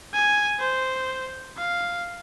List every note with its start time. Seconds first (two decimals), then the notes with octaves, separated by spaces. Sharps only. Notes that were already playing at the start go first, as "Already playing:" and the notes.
0.14 G#5
0.60 C5
1.58 F5